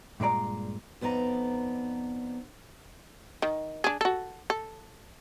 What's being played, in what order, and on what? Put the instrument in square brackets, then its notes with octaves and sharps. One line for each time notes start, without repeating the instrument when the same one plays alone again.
[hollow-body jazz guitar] G2 A#2 G#3 D5 A#5
[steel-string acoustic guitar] F2 B3 D#4 D5 A#5
[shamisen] D#3
D4 G#4
F#4 A4
A4